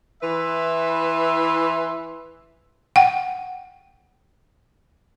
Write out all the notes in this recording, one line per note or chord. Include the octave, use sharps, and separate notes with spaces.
E3 B4 E5 C6
F#5 G5